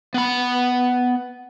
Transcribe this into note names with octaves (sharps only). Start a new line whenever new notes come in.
B3 B5